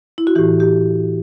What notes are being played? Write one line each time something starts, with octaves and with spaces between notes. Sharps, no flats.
E4
F#4
A2 E3 G4
G4